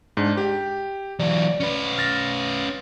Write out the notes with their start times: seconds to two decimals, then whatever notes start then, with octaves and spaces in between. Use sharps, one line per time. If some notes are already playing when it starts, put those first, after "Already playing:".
0.17 G#2 D4
0.37 G4 G5
1.19 E3 F#3 D5
1.60 C#4 B4
1.98 F6 A6 A#6